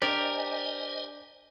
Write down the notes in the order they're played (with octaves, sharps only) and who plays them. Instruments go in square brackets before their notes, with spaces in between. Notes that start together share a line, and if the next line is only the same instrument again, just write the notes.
[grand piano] D4 [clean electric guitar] G4 A#4 [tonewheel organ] C5 D#5 G#5 [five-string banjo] D5